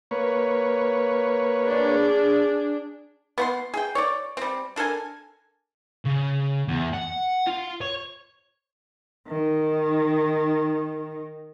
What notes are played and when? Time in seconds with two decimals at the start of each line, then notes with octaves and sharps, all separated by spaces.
0.11 A#3 B4 C#5
1.64 D4 G#4
3.38 B3 F#5 C6
3.74 G#4 G5
3.95 C#5 D5
4.37 G3 C4
4.76 D4 A4 A#4 G#5
6.05 C#3
6.68 E2
6.94 F#5
7.47 F4
7.81 C#5
9.28 D#3 D#4